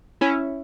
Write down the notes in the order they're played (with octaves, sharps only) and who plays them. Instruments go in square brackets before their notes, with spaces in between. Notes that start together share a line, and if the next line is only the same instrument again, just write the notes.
[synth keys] C#4 E4